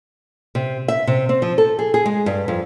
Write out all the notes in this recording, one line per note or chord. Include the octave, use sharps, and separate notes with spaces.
C3
E5
C3
C4
F3
A4
G#4
G#4
G#3
G2
F2